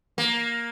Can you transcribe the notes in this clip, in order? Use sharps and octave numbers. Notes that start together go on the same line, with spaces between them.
A#3